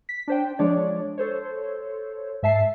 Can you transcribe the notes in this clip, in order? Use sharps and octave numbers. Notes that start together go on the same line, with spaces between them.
B6
D4 C5 G5
F3 G#3 D4 C#5 D5
A4 C5 C#5
G#2 E5 A5 C7